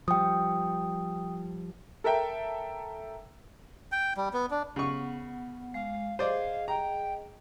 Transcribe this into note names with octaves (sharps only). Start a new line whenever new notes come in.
F3 G3 G5 D#6
A4 A#4 E5 G5
G5
G3
B3
D4
C#3 B3 F#5 C#6
G#3 F5
G#4 C5 D5 D#5 F5
G5 A#5